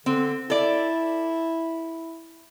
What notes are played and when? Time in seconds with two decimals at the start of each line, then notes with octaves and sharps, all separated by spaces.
0.06 D3 C4
0.50 E4 A4 D5